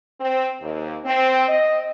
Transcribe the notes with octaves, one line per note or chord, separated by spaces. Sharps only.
C4
D#2
C4
D#5